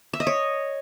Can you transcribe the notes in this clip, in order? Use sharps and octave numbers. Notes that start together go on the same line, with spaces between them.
E5
D#5
C#5